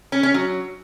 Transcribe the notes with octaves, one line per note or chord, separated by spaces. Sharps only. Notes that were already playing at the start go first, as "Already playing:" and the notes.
C#4
C#4
F#3